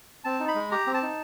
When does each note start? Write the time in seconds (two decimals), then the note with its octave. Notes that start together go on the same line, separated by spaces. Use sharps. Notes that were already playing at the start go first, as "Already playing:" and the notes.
0.24 C4 A5
0.40 D#4
0.48 B5
0.55 G#3
0.71 G4 A#5
0.87 C4
0.94 A5
1.02 D#4